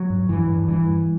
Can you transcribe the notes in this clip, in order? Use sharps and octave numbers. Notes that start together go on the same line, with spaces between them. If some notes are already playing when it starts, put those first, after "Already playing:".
Already playing: F#3
G2
G2 E3
G2
G2 E3
G2